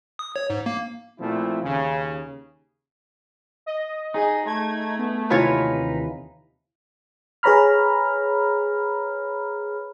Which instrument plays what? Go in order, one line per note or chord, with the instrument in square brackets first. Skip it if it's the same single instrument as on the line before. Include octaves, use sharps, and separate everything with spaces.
[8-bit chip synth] D#6
C#5
G#2
A#3
[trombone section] A#2 F3 A3 C4 E4
D#2 C#3
[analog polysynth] D#5
[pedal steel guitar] D#4 [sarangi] G#4
[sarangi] A3 [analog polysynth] G#6
[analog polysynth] B3
[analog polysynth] D#2 C3 [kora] E3 F4 C#5 [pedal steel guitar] D#4 B4
[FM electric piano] G#4 B4 C#5 A#5 B5 F6